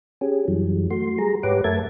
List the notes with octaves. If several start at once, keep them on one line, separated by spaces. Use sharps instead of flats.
C#4 G4 G#4
F#2 E3 F#3 G3
A3 F#4 C6
G3 G#4 A#5
G#2 G4 B4 C#5 F#5 D6
F#2 A3 A#4 E5 A5 G#6